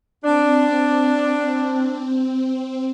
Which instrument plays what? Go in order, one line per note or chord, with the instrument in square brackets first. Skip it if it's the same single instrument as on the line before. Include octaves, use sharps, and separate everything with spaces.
[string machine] C4 [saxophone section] D4